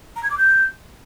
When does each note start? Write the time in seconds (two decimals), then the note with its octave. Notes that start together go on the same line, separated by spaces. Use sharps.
0.16 A#5
0.23 G#6
0.30 D6
0.38 G6